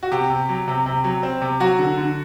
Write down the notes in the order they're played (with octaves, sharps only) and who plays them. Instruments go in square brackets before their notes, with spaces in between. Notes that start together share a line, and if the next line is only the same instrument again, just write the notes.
[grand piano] F#4
C3 G4
C3
F#3
C3
C3
F#3
C4
C3
F#3 F#4
D3
D3